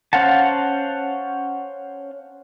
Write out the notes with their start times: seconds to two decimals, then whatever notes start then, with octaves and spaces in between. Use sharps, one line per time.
0.13 C#4 C5 F5 F#5 A5